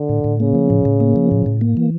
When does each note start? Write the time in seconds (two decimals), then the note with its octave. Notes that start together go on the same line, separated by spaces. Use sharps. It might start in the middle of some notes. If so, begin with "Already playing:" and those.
Already playing: D3
0.09 A2
0.24 A2
0.40 C#3 A#3
0.55 F3
0.70 A2
0.85 A2
1.00 A#3
1.16 F3
1.31 A2
1.46 A2
1.61 A#3
1.77 E3